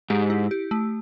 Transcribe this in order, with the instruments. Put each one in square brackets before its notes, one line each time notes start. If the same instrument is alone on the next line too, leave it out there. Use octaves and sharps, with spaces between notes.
[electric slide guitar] G#2 [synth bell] G4
[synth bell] E4
G4
A3